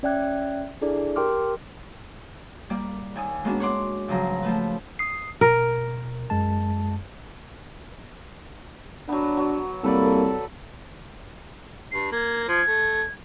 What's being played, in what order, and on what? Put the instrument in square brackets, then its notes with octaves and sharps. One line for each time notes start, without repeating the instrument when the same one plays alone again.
[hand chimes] C#4 D5 E5 G5 F#6 G#6
D4 E4 G#4 A4 D5
G4 A#4 G5 C6 D6 F6
[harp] G3 A#3 D5
D#2 G#5 D#6
G#3 A#3 B3 C#4 D4 F#4
C#5 F#5 C6 D6
G2 C#3 F3 F#3 A#5
F3 A3 B4
[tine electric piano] D#6 C7
[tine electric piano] B2 [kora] A#4
[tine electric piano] F#2 G#3 A5
[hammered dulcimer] F#3 B3 [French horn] D4
[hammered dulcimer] F#3
[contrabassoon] C2 [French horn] A#3 [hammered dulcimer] A4 B4 D5
[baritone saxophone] G2 [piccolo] C7
[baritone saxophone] A#3 [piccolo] G#6
[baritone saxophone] F3 [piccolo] G#6
[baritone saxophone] A3